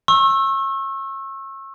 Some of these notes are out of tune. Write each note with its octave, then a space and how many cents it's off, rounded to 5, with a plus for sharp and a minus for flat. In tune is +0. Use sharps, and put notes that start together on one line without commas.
C#6 -35 E6 +0